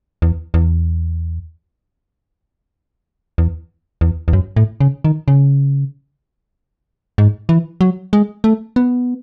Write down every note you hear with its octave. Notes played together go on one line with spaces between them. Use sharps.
E2
E2
E2
E2
E2
F#2
A2
C#3
D#3
C#3
G#2
E3
F#3
G#3
A3
B3